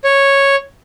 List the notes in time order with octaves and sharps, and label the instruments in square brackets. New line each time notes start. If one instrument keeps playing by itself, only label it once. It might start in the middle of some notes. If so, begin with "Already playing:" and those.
[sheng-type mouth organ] C#5